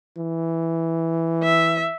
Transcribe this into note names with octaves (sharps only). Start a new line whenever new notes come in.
E3
E5